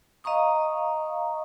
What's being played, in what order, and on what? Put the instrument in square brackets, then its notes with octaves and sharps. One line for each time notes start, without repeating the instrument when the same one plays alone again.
[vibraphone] D#5 F5 A#5 C#6 D#6